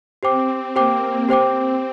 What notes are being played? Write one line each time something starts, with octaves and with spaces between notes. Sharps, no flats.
C4 G4 C5 G5 D6
A#3 G4 C5 G5 D6
C4 G4 C5 G5 D6